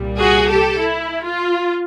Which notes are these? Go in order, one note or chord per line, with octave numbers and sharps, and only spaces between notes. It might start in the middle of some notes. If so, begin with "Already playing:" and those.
Already playing: C2 A#2 G3
F#4 G#4
G4 A4
E4
F4